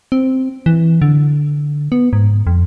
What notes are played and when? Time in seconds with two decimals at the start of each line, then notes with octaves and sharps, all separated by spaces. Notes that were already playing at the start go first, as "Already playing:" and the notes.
0.12 C4
0.66 E3
1.02 D3
1.92 B3
2.13 G#2
2.47 F2